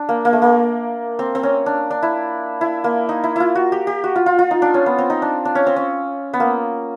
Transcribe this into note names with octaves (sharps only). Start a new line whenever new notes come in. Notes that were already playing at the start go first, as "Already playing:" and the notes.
Already playing: D4
A#3
A#3
A3
A#3
C4
C4
C#4
D4
D4
E4
E4
A#3
D#4
E4
E4 F4
F#4
G4
G4
F#4
F4
F4
F4
D#4
D4
C#4
B3
C4
D#4
D4
D4
C#4
C4
C#4
B3
A#3